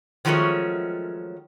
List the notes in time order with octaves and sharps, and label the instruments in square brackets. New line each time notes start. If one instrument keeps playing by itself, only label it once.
[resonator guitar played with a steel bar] D#3 F3 F#3 G#3 A3 C#4